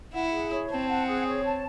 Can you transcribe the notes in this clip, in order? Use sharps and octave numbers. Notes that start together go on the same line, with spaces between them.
E4 F#5
G#4
C#5
C4 A5
F#5
G#4
C#5
A5